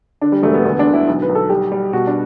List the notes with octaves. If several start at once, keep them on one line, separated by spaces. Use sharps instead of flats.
D3 D4
G3
E1 A3
B3
D2 B3
D4
D3
E4
B1
B4
B1
A4
G3 G4
G3
B2 F#4
D4